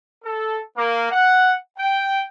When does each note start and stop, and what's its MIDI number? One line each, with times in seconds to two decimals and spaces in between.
0.24 0.59 69
0.76 1.07 58
1.10 1.51 78
1.77 2.20 79